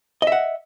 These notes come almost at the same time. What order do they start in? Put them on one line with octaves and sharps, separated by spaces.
D#5 E5 F#5